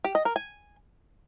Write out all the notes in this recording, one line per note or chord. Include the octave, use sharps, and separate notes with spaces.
G4
D#5
A#4
G#5